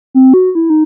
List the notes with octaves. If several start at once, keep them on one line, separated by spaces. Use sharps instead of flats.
C4
F#4
E4
D#4